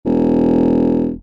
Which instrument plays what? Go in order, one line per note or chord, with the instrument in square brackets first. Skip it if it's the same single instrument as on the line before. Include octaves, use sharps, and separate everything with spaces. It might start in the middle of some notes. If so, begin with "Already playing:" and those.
[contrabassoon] E1